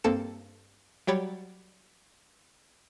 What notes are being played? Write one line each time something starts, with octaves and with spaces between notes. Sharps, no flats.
G2 A#3 C4 A4 C#7 E7
F#3 G3 G4 C#5 B5 A6